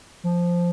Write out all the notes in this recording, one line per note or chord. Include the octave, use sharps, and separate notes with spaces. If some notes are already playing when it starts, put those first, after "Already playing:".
F3